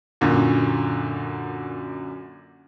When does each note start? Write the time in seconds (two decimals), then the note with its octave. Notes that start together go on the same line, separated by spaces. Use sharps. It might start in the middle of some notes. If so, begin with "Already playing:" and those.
0.21 F#2 A#2 D3